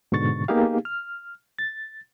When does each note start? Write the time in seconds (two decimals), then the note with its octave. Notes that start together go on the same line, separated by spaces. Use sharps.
0.12 G#2 B2 D3 C#6 A6
0.48 A#3 B3 D#4 G4 G#4 F5
0.85 F6
1.59 A6